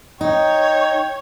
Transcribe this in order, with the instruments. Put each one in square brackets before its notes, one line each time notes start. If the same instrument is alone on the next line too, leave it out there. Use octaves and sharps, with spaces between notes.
[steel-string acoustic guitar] D#4 [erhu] C#5 [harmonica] G5